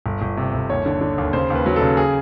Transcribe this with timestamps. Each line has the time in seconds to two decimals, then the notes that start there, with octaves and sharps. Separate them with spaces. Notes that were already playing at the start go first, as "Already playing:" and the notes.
0.06 G1
0.22 G1
0.37 C3
0.54 G1
0.70 D#2 C#5
0.86 D3
1.01 D3
1.18 D#2
1.33 C#3 C5
1.50 D#2
1.55 B4
1.66 F#3
1.76 A4
1.82 C#3
1.97 G#4